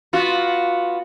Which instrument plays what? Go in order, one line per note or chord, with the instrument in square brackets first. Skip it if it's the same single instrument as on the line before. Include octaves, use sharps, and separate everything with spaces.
[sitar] B3 F4 F#4